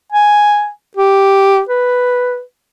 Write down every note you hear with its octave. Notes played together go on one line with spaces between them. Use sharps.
G#5
G4
B4